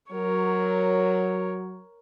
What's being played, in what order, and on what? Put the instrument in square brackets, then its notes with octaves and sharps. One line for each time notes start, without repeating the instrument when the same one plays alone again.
[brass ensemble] F#3 [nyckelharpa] A#4 C#5